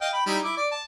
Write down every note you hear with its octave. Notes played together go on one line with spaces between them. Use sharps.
D#5 F5 G5
G5 B5
G3 D#4 E4
E4 D6
D5 D6
A5